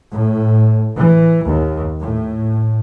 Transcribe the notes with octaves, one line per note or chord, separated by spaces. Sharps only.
A2
E3
D#2
A2